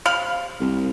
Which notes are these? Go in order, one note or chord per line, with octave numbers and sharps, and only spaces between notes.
C3 F5 B5
C2